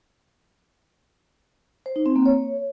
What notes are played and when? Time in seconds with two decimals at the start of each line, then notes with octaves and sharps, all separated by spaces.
1.86 C5
1.96 D#4
2.06 C4
2.16 A#3
2.26 C#5